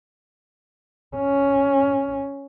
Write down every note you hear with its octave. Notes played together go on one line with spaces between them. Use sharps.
C#4